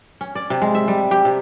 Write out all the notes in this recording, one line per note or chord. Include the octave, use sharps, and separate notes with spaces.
C#4
D5
C3
G#3
E5
G3
G4
C3